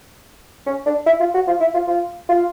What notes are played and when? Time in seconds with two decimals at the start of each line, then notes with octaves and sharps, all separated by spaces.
0.66 C#4
0.86 D4
1.06 E4
1.20 F4
1.34 F#4
1.47 F4
1.60 E4
1.74 F4
1.87 F4
2.29 F4